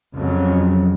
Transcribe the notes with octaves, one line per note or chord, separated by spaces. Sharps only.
F2 C#3 F#3